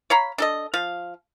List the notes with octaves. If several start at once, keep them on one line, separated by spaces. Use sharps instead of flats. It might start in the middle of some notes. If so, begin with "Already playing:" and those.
C#5 F5 A#5 B5
D4 A4 D#5
F3 F5